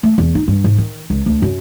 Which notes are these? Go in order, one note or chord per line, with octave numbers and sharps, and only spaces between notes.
A3
E2
D#4
G2
G#2
D#3
C#2
D2
F#2